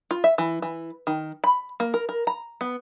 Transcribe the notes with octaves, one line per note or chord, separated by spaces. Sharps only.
F4
E5
E3
E3
D#3
B5
A#3
A#4
A#4
A#5
B3